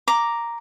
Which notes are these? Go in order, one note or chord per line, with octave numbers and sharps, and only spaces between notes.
A#5 D6